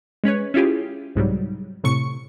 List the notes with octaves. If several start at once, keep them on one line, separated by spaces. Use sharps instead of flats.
G#3 C#4 B4 C#5
C#4 E4 F4 G4 G#4
C2 G#2 F#3 G3
A2 C3 C#6 C#7